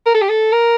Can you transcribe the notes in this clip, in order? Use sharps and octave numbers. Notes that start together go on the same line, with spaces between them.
A#4
A4
G4
A4
A#4